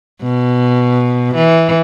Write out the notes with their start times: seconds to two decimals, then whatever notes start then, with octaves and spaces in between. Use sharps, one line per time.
0.22 B2
1.35 E3